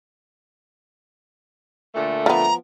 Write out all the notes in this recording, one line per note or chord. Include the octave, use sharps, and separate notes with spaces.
A#2 D3 A3
F3 B3 A#5